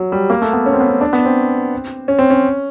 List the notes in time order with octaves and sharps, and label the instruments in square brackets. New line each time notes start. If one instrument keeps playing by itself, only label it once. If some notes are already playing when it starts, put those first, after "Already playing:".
Already playing: [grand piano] F#3
G3
A#3
A3
B3
C#4
C4
B3
C4
D4
B3
C4
C#4
C4
C#4